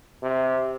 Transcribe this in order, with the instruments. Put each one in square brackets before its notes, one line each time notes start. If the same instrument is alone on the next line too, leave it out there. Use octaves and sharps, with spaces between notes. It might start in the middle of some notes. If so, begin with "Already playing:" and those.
[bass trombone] C3